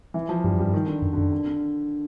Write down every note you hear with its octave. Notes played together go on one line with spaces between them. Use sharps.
E3
F3
G2 G3
F#2
G2 G3
D#3
D3
F#2
F#2 D3
D3
D3